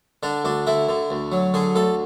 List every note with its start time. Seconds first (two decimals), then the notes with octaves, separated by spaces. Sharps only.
0.23 D3 D4
0.45 D2 D4
0.67 D3 E4
0.89 D3
1.10 D2
1.32 F#3
1.54 D3 G#4
1.75 D2 A4